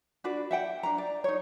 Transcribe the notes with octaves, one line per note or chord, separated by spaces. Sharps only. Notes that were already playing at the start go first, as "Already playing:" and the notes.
D4 F#4 B4 D5
E5 F#5 G5
D4 A#5
D5
D#4 C#5